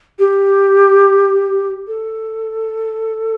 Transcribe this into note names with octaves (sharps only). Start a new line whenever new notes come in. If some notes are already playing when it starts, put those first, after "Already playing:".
G4
A4